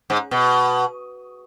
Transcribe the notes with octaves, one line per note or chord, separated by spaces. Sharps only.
G#2
B2